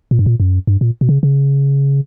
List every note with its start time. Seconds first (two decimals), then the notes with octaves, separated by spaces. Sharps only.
0.11 A#2
0.19 G2
0.26 A#2
0.40 F#2
0.67 G2
0.81 A#2
1.01 B2
1.09 C#3
1.23 C#3